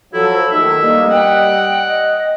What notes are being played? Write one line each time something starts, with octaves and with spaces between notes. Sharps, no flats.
F3 F#3 E4 A4
D#2 A2 D#3 E5
G3 A#3 D#5
F#5 G5
D#5